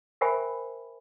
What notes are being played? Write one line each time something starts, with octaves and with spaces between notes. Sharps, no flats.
A#4 C5 E5 G5 G#5 B5